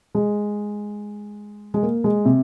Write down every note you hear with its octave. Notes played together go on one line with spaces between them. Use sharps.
G#3
G#3
A#3
G#3
C3